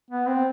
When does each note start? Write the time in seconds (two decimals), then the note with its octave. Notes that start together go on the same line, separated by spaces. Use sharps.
0.11 B3
0.27 C4